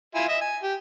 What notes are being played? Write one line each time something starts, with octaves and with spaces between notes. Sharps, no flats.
E4 F4 G#5
D#5 E5
G#5
G4